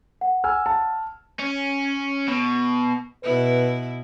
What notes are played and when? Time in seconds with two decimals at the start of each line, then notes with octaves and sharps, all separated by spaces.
0.21 F#5
0.44 G#5 E6 F6
0.66 A5
1.40 C#4
2.28 B2
3.23 B2 E4 B4